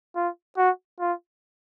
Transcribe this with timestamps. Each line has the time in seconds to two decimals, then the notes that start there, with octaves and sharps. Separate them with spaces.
0.15 F4
0.57 F#4
1.00 F4